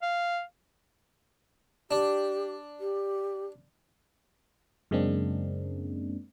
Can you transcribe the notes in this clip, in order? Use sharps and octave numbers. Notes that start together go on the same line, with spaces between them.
F5
D4 G4
G4
F#2 C#3 G#3 A#3 C4 D4